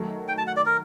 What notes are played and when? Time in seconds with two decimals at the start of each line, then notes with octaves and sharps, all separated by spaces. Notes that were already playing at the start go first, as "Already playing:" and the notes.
Already playing: D#3 F#3 A3
0.28 G5
0.38 A5
0.47 F#5
0.57 D5
0.66 A#4